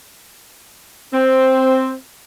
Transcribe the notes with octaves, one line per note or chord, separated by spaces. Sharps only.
C4